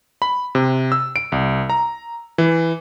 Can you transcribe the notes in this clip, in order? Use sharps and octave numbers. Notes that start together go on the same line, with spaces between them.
B5
C3
E6
D7
C2
A#5
E3